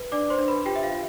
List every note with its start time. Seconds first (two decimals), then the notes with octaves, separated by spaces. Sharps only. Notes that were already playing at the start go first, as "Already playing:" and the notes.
Already playing: B4
0.12 D4 D5 D6
0.30 C5 C6
0.38 D4
0.48 B4 B5
0.66 F4 G4 G5
0.76 E5
0.83 F5
0.92 F4